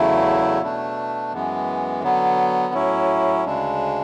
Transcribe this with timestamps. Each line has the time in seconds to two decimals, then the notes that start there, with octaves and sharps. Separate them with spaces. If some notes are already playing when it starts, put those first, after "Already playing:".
Already playing: E2 C#3 F#3 A3 E4
0.62 B2 A3 D4
1.33 F#2 E3 G#3 B3
2.03 D3 F#3 B3
2.74 A2 F#3 C#4 E4
3.44 D2 C#3 G#3 D4